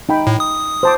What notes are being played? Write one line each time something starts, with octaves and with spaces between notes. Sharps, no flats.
D#4 G5 B5
A2
D#6
C5 A5 D6